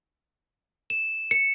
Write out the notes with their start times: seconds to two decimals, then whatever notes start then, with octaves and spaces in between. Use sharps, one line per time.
0.90 E7
1.31 C#7